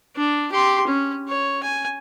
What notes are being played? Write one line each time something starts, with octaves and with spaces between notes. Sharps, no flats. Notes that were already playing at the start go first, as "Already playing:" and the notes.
D4
G4 C6
C#4
C#5
G#5